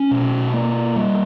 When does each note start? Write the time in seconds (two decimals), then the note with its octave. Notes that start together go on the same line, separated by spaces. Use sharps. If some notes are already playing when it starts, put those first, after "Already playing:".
Already playing: C#4
0.11 B2
0.53 A#3
0.96 G3